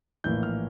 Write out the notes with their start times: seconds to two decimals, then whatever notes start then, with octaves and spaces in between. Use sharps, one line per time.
0.24 A#1 A2 E3 A#3 G6
0.43 F6